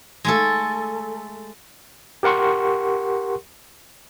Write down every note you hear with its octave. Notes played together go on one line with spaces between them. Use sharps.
G#3 A3 A4
G4 A#4 F#5 C6 C#6